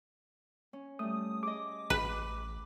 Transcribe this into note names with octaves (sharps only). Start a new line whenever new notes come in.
C#4
G3 A3 D#6
G#4 D#5 D6
A1 B4